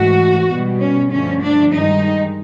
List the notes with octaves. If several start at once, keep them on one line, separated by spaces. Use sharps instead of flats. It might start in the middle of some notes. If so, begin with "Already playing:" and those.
Already playing: G#2 E3 A3 F#4
B2 G3
C#4
G2 D3 F3 A3 C#4
D4
G2 D#3 G#3 D#4